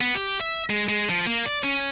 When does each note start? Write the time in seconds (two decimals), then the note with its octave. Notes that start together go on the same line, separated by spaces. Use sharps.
0.01 B3
0.15 G4
0.41 E5
0.70 G#3
0.89 G#3
1.10 F3
1.27 A#3
1.46 D5
1.64 C#4